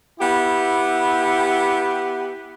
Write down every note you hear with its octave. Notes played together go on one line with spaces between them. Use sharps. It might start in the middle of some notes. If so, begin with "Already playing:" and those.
B3 E4 G4